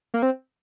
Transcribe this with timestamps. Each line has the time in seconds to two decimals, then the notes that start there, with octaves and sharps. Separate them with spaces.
0.14 A#3
0.22 C4